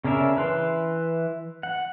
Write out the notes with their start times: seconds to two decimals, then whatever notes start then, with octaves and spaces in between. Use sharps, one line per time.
0.04 C#3 C#4 D4 A#4 E5
0.37 E3 B4 C6
1.63 F#5